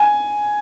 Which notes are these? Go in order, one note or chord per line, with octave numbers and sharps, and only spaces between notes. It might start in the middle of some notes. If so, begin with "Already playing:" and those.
Already playing: G#5